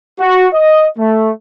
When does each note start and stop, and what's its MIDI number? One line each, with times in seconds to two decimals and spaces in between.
0.20 0.47 66
0.54 0.86 75
0.98 1.31 57